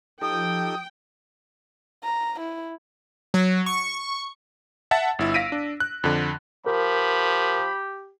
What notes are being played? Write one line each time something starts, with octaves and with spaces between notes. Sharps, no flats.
F3 D#4 G4 A4 G5 D#6
A#5
E4
F#3
C#6
E5 F#5 A5 A6
G1 E4 E6
F5 A#6 B6 D7 D#7
D4
F#6
F2 D3
F3 G4 A#4 B5